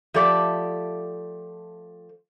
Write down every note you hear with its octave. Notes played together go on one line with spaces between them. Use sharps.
F3 A3 G4 A4 D5 E5